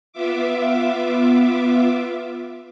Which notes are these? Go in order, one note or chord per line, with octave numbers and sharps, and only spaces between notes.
B3 F4 E5 D6